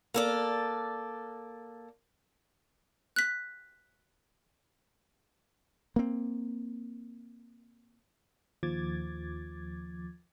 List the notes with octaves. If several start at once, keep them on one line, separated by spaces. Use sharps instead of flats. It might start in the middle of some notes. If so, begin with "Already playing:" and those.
A#3 A4 D5
F#6 B6
A#3 C4
D#2 F3 D6 G#6 A6